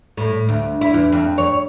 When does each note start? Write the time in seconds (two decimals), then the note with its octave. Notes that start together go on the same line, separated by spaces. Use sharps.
0.17 A2
0.49 D2
0.81 E4
0.94 E2
1.12 F2
1.38 C#5